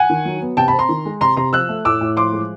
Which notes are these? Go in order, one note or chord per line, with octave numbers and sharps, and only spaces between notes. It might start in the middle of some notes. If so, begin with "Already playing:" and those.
Already playing: F#5 G#5
D#3
F#3
B3
C3 G5 A5
A5 B5
C4
A#5 C6
D#3
G#3
C3 A#5 C6
C3 A#5 C6
F3 E6 F#6
A3
A2 D6 E6
A2
F3 C6 D6
G#3